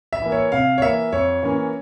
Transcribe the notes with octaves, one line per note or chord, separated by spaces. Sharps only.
E5
E3 A#3
C#5
C3 F5
C#5
E3 A#3 E5
F2 C#5
E3 A#3 C#4